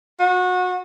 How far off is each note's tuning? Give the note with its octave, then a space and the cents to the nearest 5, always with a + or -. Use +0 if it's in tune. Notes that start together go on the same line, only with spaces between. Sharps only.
F#4 -25